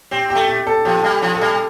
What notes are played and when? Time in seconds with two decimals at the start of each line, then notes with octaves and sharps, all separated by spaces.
0.11 C4 G4
0.30 G4
0.35 A3
0.48 G4
0.67 A4
0.85 F3 G4
1.04 G3
1.10 G4
1.22 F3
1.35 A4
1.41 G3